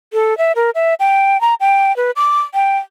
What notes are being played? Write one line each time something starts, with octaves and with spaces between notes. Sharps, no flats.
A4
E5
A#4
E5
G5
A#5
G5
B4
D6
G5